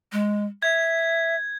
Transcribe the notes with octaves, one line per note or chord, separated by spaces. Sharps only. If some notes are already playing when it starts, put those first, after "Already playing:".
G#3
E5 G#6